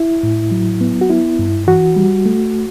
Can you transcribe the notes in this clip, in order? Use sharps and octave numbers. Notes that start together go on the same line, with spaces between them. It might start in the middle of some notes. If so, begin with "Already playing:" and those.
Already playing: E4
A2
F#3
B3
F#4
B3 E4
G2
E3 F#4
G3
A3